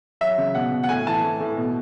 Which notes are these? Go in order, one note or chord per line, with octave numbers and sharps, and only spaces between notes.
F#3 E5
C#3
B2 F#5
B2
F#5
A2 G#5
E3 A5
A2
A2
B2